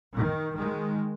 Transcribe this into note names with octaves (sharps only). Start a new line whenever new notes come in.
D#3
D#3 G#3